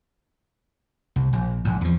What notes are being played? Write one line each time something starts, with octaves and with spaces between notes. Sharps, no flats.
C2
A#1
A#1 G#2
E2 F3